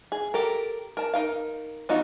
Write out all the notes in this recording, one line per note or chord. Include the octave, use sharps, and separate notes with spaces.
G#4
G4 A4 A#4
A#4 A5
D#4 A#4 F5
E3 B3 D#4 F4 F#4